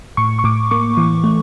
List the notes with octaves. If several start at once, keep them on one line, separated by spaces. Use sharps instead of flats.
A2 C#6
C#6
A2 D6
A#3 C#6
E3
A3